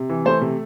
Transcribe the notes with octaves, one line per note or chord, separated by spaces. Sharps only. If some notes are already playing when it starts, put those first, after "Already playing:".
Already playing: C3
E3
A3 C5
C3